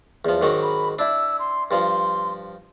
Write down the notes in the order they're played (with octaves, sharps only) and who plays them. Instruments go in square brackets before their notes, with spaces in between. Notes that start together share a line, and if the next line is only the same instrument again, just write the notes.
[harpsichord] E2 F3
G#2 D#3 F#3
[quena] B5
[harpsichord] D4 E4 [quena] E6
[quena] C6
[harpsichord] G2 F3 [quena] C6